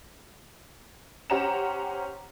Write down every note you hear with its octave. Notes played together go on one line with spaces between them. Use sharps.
C#4 G4 C5 F#5 A#5 E7